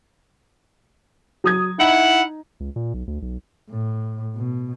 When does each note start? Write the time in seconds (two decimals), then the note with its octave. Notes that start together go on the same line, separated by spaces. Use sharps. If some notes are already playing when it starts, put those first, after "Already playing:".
1.44 F#3 D#6 G#6
1.78 D#4 E4 F#5
2.60 C#2
2.76 A#2
2.94 B1
3.07 D2
3.22 B1
3.70 A2
4.36 B2